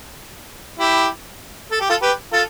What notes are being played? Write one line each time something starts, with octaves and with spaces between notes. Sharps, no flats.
E4 G4
A4
G4
F4 A4
G4 B4
F4 A4